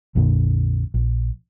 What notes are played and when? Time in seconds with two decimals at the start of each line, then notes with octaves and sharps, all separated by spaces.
0.15 A#1 F2 A#2 D3
0.94 A#1